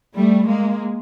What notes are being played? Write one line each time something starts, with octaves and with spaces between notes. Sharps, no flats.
G3 A3
G#3 A#3